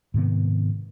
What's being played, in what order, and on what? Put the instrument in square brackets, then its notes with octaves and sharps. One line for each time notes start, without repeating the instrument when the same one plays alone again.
[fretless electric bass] G#2 C3 D#3 B3